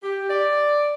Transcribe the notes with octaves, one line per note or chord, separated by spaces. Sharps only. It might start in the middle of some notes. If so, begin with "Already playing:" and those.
G4
D5